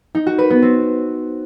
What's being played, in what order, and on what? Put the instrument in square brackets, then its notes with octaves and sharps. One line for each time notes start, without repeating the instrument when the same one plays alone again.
[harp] D#4
F#4
B4
B3
C4